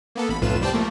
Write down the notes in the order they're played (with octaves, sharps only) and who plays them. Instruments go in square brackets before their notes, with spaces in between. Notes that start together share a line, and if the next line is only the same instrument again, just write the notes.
[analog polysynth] A#3 B3 A4
A1 B5
B1 F2 A2 F4 B4 E7
C2 G3 C5 D5 G5 A5
F3 A3 A#3